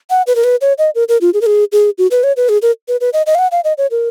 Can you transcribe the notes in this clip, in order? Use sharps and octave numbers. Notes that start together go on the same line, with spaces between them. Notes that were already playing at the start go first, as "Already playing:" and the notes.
F#5
B4
A#4
B4
C#5
D#5
A#4
A#4
F4
G#4
A#4
G#4
G#4
F#4
B4
C#5
B4
G#4
A#4
B4
B4
D#5
D#5
F5
F#5
F5
D#5
C#5
A#4